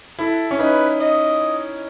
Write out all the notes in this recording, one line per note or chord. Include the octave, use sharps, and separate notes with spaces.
E4 A4
C#4
D#4 B4
D#5